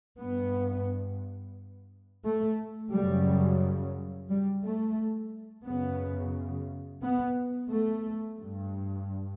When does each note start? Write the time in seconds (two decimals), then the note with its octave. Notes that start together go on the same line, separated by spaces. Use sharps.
0.20 G2 B3
2.24 A3
2.92 F#2 C#3 G3
4.29 G3
4.63 A3
5.66 F#2 C#3 B3
7.02 B3
7.70 A3
8.39 G2